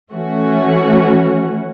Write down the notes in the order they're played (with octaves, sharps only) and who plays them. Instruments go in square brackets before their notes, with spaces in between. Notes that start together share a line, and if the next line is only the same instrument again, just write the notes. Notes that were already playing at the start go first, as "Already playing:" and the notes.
[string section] E3 A3 C#4 F#4